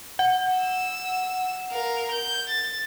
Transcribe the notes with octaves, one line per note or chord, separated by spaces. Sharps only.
F#5
E6
A#4 F5
G6
A6